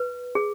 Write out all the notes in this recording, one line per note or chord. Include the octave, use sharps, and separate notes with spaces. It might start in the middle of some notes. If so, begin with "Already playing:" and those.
Already playing: B4
G#4